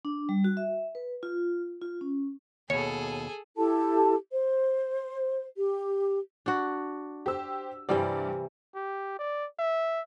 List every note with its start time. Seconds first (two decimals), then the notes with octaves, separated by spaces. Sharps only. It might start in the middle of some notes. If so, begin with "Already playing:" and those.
0.05 D4
0.29 G3
0.44 F#4
0.57 E5
0.95 B4
1.23 F4
1.82 F4
2.01 C#4
2.70 D#2 B2 G#4 A4 C#5 C#7
3.57 E4 G4 A4 A5
4.32 C5
5.57 G4
6.46 D4 F#4
7.26 G4 C5 E6
7.89 G2 C3 E3 G3 G4 D5
8.75 G4
9.19 D5
9.59 E5